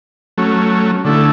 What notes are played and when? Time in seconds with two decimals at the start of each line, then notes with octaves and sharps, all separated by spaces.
0.38 F#3 A3 C#4
1.05 D3 A3 E4